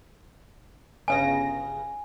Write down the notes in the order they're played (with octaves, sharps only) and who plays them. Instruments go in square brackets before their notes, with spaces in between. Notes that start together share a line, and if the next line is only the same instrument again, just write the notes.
[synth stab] G1 C#3 A#6 [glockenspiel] G#5